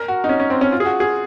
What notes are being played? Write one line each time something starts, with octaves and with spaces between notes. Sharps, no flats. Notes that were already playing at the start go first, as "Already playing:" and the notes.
Already playing: A#4
F#4
D#4
C#4
C#4
C4
C#4
F4
G#4
F#4
G#4